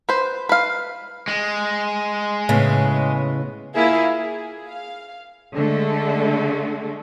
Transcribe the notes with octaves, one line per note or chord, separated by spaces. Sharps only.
B4 C5
B4 F5
G#3
A2 C#3 B3
A#3 E4 F4 G#4 E5 F5
G#4
F5
D3 G#3 A3